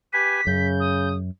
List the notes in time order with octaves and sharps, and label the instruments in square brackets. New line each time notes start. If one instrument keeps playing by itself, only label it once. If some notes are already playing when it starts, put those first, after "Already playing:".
[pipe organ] G4 B4 G#5 [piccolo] B6
[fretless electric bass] F#2 [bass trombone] C#3 [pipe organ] G6
[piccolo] D#6